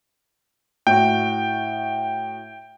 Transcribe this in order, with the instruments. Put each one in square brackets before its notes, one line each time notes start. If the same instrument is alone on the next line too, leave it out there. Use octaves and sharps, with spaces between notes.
[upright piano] A2 F#4 [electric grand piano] G5